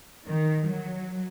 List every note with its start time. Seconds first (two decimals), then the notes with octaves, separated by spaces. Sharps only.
0.25 D#3
0.66 F#3